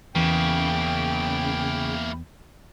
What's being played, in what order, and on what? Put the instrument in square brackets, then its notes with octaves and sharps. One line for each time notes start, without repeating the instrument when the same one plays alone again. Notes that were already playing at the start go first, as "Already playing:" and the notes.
[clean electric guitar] E2 [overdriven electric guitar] C#3 [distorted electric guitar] A#3 E4 [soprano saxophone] G5